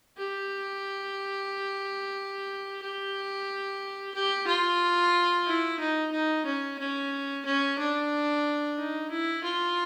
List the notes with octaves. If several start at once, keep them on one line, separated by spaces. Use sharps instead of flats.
G4
G4
G4
F4
E4
D#4
D#4
C#4
C#4
C#4
D4
D#4
E4
F4